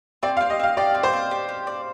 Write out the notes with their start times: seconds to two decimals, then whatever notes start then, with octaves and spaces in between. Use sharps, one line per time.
0.23 C4 D5
0.37 F5
0.40 C4
0.50 D#5
0.60 C4 F5
0.77 G4 D5
0.95 C4
1.03 C5
1.13 C4
1.31 G4
1.49 G4
1.67 D5